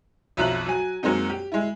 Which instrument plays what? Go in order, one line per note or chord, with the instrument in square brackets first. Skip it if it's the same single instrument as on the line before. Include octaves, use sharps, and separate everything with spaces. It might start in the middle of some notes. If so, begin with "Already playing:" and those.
[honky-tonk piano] B1 F2 E5 A#5 F#6 F#7
F#3 G#5
F#2 G#3 A#3 C4 D#4
G4
G#3 E4